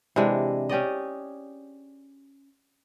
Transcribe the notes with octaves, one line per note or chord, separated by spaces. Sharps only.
C3 E3 G#3 D4
C#4 G4 D5 D#5